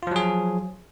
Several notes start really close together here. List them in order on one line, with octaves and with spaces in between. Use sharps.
F4 F3 F#3 G#4